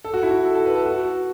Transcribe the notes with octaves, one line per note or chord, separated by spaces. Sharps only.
A4
F#4
E4
F#4
A4
A4
B4
A4
F#4